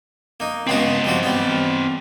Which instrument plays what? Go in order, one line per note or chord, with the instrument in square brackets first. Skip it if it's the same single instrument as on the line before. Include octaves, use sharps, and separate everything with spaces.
[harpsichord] A#3 D#4
[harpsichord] C#2 B3 F#4 [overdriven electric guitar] C4 D#5
[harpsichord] F3 G3 F#4
G3 B3